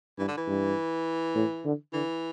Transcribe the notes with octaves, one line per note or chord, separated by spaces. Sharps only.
G2 E3
D3
E3
G2
A2
D3
D3 E3